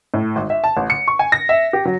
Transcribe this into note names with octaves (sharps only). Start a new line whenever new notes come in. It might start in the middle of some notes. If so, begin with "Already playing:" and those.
A2
G#1
E5
A5
A1
C#7
C#6
G#5
A#6
E5
G4
F#3